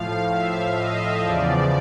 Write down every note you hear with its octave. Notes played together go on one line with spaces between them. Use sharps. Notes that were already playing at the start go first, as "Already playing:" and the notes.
Already playing: A2 F3 F5
E5
D#5
E2 C#3 F3 D5